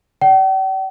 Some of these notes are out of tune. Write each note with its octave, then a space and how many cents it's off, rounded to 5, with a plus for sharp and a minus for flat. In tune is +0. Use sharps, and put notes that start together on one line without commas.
D5 +0 G5 -45